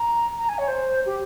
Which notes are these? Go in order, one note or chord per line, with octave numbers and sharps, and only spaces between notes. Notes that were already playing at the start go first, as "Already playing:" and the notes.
Already playing: A#5
A#5
G#5
C#5
C5
G4